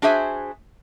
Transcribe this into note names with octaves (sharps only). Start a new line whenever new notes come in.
D4 F#4 G#4 C5 E5 G#5